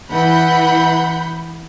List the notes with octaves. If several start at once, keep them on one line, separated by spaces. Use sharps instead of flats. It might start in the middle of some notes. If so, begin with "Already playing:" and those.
E3 F#5 B5 G6